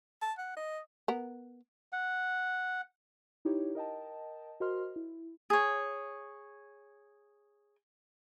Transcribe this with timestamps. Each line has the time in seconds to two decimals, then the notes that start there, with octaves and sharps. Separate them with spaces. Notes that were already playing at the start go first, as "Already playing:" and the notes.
0.22 A5
0.38 F#5
0.57 D#5
1.08 B3 A#4
1.93 F#5
3.45 D#4 E4 G4 C#5
3.75 A#4 D#5 G5 A5
4.60 F#4 A#4 C5 D#5 C6 F6
4.96 E4
5.50 G#4 C#5